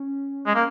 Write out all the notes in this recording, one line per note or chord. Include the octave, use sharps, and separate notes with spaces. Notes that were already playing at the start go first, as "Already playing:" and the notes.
Already playing: C#4
G#3
A#3